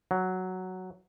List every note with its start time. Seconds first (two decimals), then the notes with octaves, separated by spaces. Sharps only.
0.11 F#3